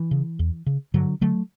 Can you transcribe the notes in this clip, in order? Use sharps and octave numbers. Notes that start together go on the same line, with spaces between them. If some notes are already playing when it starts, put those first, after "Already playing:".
Already playing: E3
C#3
E2
C#3
G2 D3 F#3
D3 F#3 A3